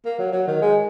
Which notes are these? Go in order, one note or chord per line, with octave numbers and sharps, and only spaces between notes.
A#3
F#3
F#3
D#3
G#3